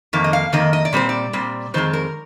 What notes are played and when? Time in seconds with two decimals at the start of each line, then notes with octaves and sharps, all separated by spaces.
0.13 F2 D#3 A#3
0.24 D#5
0.33 F5
0.52 F2 D#3 A#3 D#5
0.73 D#5
0.85 D5
0.93 A#2 G3 C4 C5
1.09 D5
1.33 A#2 G3 C4
1.74 F2 D#3 G#3 C4 C5
1.93 A#4